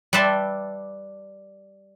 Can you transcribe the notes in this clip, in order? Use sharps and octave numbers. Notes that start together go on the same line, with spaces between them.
G3 B4 D5 E5 A5 C6